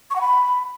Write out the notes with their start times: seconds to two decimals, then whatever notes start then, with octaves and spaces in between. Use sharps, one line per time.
0.10 C#6
0.16 F#5
0.21 B5